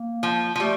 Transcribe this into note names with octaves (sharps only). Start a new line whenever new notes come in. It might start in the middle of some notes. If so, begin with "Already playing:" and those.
Already playing: A#3
F3
F3
G3 A3